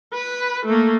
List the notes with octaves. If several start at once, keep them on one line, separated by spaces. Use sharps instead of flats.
B4
A3 A#3